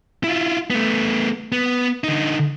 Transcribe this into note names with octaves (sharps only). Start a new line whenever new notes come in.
E4 F4
A3 B3
B3
D3 D#4